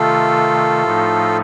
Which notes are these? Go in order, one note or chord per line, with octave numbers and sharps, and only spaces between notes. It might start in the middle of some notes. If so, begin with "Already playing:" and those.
Already playing: C3 D#3 A3 F4 A4
A2 F3 A3 D#4